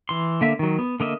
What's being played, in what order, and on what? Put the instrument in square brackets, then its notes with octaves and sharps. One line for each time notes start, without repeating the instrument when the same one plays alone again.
[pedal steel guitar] E3 C6
D3 A#3 E5
D#3 F#3
B3
D3 A#3 D#5 E5